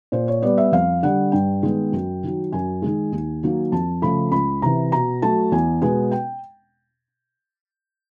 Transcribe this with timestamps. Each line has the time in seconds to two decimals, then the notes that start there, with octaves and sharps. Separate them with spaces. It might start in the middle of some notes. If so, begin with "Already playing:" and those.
0.12 A#2 C5
0.28 C#5
0.42 G3 B3 D5
0.58 E5
0.72 F2 F5
1.03 D3 G3 F#5
1.32 G2 G5
1.62 D#3 G#3 B3
1.92 F#2
2.23 D#3 F#3
2.52 F#2 G#5
2.82 D#3 G#3
3.12 D#2
3.43 D#3 F#3 A#3
3.72 F2 A5
4.02 C#3 F3 A3 B5
4.32 C#2 B5
4.62 C3 E3 A#5
4.92 B2 A#5
5.22 F#3 A3 A5
5.52 E2 G#5
5.82 B2 G#3 B3 G#5
6.11 G5